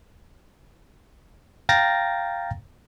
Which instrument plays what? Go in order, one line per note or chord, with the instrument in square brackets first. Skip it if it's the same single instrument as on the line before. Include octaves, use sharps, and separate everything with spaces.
[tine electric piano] F5 G5 A#5 A6 A#6